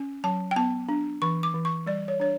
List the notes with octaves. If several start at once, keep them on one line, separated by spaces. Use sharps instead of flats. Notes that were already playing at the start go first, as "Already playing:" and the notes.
Already playing: C#4
F#3 A5
G5
B3 A5
D4
E3 C#6
D6
E3
C#6
G3 D5
C#5
D4 C#5